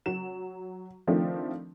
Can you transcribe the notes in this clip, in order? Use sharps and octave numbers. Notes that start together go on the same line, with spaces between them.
F#3 E7
D#3 F3 A3 C4 D4